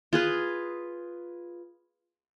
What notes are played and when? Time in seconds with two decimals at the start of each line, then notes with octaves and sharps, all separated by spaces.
0.13 F4 G#4 B4